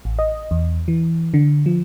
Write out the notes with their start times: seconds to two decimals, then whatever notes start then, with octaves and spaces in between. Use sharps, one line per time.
0.05 A1
0.19 D#5
0.51 E2
0.88 E3
1.34 D3
1.66 F3